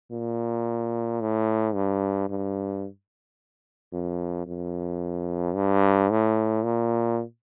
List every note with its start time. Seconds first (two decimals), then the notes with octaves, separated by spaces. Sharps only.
0.12 A#2
1.21 A2
1.75 G2
2.30 G2
3.93 F2
4.47 F2
5.55 G2
6.10 A2
6.65 A#2